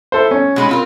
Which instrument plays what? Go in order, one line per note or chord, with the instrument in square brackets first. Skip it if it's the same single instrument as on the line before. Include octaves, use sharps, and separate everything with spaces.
[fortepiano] E4 A4 C5
C#4
[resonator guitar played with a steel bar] B2 G#3 D#4
C4 F4 A#4